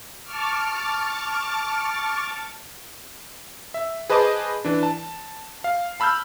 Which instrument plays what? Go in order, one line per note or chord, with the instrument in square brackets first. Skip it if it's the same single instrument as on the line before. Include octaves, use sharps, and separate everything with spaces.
[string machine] A5 C#6 D6 F6
[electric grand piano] E5
G#4 B4 C5 D#5 A5 D6
E3 D4
A5
F5
A5 B5 E6 F6 G6